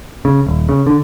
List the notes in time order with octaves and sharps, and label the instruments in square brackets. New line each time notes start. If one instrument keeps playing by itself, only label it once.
[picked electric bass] C#3
D#1
C#3
D3